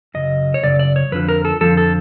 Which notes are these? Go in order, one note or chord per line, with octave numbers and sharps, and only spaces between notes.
F#2 C#3 D#5
C#5
F#2 C#3 D5
D5
C#5
F2 D3 F3 B4
A#4
A4
F2 D3 F3 A4
A4